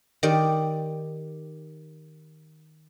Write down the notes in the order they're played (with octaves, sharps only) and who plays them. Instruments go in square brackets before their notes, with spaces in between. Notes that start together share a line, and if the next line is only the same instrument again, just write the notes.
[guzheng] D#3 G4 D5